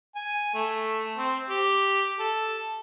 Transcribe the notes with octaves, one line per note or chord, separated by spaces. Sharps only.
G#5
A3
C4
G4
A4